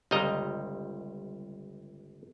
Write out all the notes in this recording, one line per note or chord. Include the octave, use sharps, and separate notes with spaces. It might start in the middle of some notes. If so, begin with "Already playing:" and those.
G1 C#2 G3 D#5 A#5